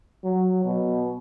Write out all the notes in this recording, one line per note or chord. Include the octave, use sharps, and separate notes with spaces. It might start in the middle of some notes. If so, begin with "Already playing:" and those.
F#3
B2